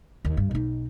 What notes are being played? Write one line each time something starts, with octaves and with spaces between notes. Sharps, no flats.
D#2
G2
B1 D#4